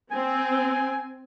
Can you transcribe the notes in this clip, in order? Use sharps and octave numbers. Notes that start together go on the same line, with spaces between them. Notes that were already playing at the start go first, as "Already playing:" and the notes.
C4 G#5